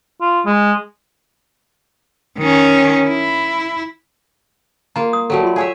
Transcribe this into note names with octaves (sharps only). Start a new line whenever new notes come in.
F4
G#3
D#3 C#4
E4
A#3 F4 A#5
D#6
F#3 G3 A3 F#4 A4
F4 C6
G#4 C#5 E5 F5 G#5 E6